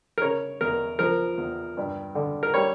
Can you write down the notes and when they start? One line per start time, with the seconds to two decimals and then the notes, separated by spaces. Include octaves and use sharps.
0.18 A#4
0.22 C#3 C#5
0.61 E2 A#4
0.99 F3 A#4
1.38 E2
1.77 G2
2.15 D3
2.43 A#4
2.54 G3 C#5